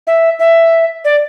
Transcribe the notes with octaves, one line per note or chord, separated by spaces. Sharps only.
E5
E5
D5